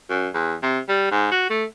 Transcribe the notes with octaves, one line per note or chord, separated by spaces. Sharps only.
F#2
E2
C3
G3
G#2
F#4
A3